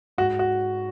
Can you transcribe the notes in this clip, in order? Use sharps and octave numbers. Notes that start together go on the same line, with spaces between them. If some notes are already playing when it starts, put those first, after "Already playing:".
G#2 F#4
F#4